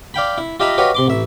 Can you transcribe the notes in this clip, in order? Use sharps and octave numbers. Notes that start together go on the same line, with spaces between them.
D5 F5 G5 B5
E4
F4 G4 D#5 E5 A#5 B5
F#4 G4 B4 C#5 D#5 F5
C3 C6 D6
A1 E5